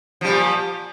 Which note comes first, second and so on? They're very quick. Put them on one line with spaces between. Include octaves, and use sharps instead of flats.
F3 G3 A#2